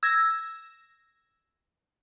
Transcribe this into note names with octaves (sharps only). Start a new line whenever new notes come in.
E6 G#6 A#6